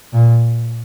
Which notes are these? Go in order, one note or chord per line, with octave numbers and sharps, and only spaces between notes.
A#2